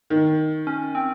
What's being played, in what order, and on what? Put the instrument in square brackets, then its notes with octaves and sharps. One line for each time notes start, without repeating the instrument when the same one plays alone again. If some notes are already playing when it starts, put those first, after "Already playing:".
[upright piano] D#3
[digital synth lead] C#4
C4